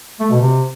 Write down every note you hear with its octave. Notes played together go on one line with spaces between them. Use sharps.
A3
B2
C3